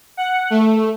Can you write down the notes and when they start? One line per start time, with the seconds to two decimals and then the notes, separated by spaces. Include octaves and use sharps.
0.17 F#5
0.50 A3